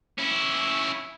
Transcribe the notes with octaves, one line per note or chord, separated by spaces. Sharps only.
C#4 E4